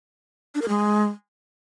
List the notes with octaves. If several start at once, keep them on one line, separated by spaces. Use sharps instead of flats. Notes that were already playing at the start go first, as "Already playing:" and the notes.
D4
A#4
G#3